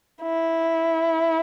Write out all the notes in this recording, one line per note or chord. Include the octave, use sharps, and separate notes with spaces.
E4